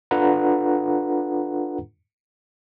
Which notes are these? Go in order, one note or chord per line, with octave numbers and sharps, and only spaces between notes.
D4 F4 A4 B4 F#5 A#5